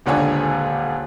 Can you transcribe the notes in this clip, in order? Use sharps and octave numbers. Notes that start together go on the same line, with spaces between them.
D#1 C#2 D3 D4 C#5 G#5